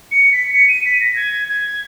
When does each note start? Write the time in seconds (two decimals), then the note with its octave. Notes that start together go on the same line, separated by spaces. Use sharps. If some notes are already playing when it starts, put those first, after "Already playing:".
0.12 C#7
0.32 B6
0.54 C#7
0.69 D#7
0.85 B6
1.01 A#6
1.16 G#6
1.48 G#6